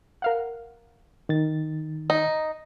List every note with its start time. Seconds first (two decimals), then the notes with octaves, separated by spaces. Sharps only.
0.22 A#4 F5 F#5
1.29 D#3 A6
2.10 D#4